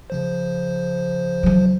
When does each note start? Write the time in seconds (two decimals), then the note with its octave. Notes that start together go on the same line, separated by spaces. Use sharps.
0.10 C#3 F3 C5
1.43 E3 F#3